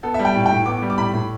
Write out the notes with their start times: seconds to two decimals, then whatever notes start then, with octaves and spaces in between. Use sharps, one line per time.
0.03 B3 A4
0.14 G3 E5
0.25 G5
0.36 A2
0.46 G5
0.51 A2
0.66 B3 D6
0.82 G3
0.90 D6
0.98 A2 B5
1.14 A2